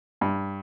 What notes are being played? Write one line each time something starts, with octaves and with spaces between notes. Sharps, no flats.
G2